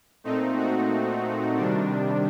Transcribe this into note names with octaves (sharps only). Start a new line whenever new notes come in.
A#2 A3 C4 D#4
F#4
C3 D#3 G3 D4